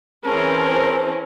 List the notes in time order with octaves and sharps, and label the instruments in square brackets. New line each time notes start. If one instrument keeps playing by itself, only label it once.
[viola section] E3 C4 C#4 [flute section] G#4 C5 A5 [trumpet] A#4